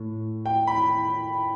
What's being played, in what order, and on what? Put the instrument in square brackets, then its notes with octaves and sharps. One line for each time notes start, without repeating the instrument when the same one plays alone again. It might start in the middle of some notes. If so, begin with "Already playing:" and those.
Already playing: [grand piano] A2
G5
B5